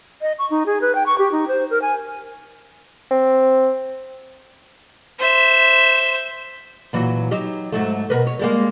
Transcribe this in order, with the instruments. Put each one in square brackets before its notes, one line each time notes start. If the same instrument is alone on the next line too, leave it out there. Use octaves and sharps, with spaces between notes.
[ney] D#5
C#6
D#4
G#4
B4
G5
C#6
G4
D#4
C5
A#4
G#5
[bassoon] C4
[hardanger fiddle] C5 E5
[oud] A#2 E3 F#3
F#3 D#4 G4
G#2 F#3 A3
B2 A#4 B4
C#5
G3 G#3 A#3